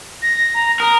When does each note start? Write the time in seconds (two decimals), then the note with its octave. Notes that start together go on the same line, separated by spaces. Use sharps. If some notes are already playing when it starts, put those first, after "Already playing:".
0.22 A#6
0.54 A#5
0.80 A#4 D#6